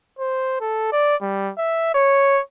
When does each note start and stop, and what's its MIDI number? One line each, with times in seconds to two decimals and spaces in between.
0.19 0.59 72
0.61 0.92 69
0.92 1.16 74
1.22 1.51 55
1.58 1.91 76
1.95 2.41 73